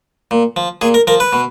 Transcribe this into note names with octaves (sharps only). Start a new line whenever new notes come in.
A#2
F3
A#2 G#4
A#4
F3 A#4
B4
B2